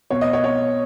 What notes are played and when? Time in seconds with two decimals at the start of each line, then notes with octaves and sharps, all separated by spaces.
0.11 B2 C#5
0.21 D#5
0.33 C#5
0.44 B2 C#5